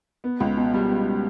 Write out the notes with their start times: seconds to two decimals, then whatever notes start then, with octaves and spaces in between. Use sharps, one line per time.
0.24 B3
0.40 C#2
0.57 B2
0.74 G3
0.90 B3